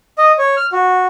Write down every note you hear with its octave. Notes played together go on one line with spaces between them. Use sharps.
D#5
C#5
F6
F#4